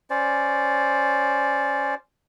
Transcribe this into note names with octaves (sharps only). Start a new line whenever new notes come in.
C#4 C5 D5